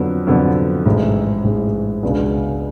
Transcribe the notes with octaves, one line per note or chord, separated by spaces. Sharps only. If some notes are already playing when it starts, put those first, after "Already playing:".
Already playing: F2 D3 F#3 B3
F2 D3 F#3 B3
A1 G#2 G#3
A1 G#2 G#3
C#2 B2 G#3 B3 D4